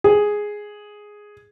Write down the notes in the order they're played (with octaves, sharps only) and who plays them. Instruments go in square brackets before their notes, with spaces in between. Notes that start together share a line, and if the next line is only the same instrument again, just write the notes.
[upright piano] G#4